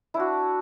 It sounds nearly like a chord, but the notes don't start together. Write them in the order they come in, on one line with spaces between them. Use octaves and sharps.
E4 D4 F#4